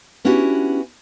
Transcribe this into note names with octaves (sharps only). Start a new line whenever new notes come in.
B3 C#4 D4 E4 F#4 G4